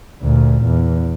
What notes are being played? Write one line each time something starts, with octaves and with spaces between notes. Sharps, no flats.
D2 A#2
E2